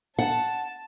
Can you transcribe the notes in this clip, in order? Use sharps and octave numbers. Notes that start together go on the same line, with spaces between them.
F#5 A5